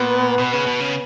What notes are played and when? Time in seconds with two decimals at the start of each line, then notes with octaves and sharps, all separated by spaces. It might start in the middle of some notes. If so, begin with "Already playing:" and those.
Already playing: A#2 B3
0.39 B2
0.53 C#3
0.67 B2
0.80 C#3